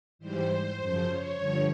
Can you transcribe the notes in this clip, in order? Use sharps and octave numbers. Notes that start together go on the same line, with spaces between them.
G#2 E3 G3 C5
C5
F#2 C#3 F3 C5
C#5
G2 D3 F3